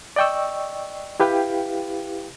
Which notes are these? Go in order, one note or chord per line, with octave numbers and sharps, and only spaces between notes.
D5 D#5 G5 C#6 E6
E4 G4 B4 F5 G5